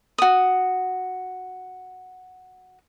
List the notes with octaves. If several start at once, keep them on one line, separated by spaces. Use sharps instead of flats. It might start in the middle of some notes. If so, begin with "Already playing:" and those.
F#4 D#6